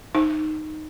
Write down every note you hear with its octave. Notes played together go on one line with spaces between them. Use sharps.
D#4